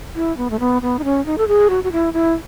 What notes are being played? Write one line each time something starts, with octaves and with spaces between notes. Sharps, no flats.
E4
B3
A3
B3
B3
D#4
C#4
D#4
A4
G#4
F#4
F#4
E4
E4